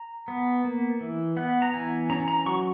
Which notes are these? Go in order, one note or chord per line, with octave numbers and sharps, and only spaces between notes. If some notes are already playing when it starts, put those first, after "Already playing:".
Already playing: A#5
B3
A#3
E3
B3 F#5
A#5
E3 G#5
C#4 A#5
A#5
F#3 C#6